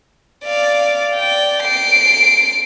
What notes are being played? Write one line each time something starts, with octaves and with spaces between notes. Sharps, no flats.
D5 F5
D5 G5
C7 D7